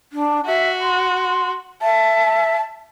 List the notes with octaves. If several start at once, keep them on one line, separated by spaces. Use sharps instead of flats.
D4
F#4 E5
C6
E5 A5